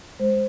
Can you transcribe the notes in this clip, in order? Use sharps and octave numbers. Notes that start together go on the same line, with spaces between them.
G#3 C5